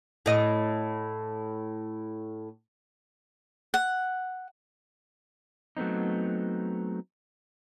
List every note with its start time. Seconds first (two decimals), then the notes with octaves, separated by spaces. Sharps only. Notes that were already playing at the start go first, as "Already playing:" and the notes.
0.26 A2 D#5
3.74 F#5
5.77 F#3 A3 B3 C4 D#4